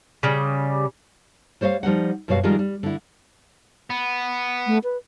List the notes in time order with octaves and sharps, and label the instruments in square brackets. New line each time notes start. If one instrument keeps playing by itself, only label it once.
[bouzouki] C#3 G3
[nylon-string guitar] G3 C5 C#5 D#5 F5
F3 G3 D#4 F#5
F#2 B2 G3 F#4 C#5 F5
D#3 F3 G3 G#3 F4 A#4
G3
D3 E4
[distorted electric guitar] B3
[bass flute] A3
B4